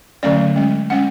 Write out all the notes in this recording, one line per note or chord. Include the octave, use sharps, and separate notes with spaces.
D3 F#3 A3 C#4 D5
G#3 C#4
G#3 C#4 F#5